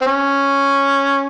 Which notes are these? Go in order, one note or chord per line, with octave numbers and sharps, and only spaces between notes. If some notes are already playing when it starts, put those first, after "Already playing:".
C4
C#4